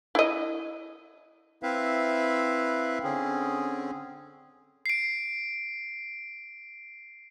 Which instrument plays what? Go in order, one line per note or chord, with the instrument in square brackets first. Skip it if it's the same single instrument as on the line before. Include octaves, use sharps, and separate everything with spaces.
[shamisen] E4 D#5
[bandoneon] C4 E4 B4 E5 F5
D3 C4 C#4 G#4
[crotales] C7 D7